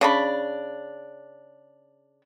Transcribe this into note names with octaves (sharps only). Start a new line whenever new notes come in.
C#3 D4 B5